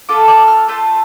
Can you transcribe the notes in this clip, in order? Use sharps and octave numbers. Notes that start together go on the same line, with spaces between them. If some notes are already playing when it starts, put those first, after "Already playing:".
A3 F4 A4 D6
D6
F6
A3 F4 A4 G6